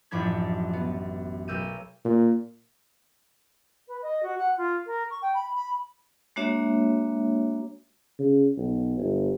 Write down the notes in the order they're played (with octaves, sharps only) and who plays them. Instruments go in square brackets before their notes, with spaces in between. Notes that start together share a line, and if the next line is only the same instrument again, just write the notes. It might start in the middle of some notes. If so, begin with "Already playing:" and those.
[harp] A1 F#2 F3 D4 B5 G#6
B3
B1 A#4 E6 G6 D#7
[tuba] A#2
[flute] B4
D#5
F#4
F#5
F4
A#4
C#6
G5
B5
B5
[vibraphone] G#3 A#3 D4 F#4 C#5 E5
[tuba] C#3
B1
G1